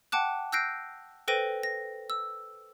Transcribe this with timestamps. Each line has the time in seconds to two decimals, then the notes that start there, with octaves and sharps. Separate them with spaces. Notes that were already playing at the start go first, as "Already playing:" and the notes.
0.12 F#5 G5 A5 D6 F#6
0.52 E6 F#6 G6 A#6 C7 D7
1.28 A4 B4 C5 G5 A#6 D#7
1.63 A#6
2.10 E6